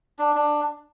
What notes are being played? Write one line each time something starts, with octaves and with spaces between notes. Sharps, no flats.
D4
D4